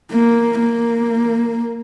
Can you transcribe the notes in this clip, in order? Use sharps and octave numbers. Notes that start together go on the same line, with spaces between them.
A#3
A#3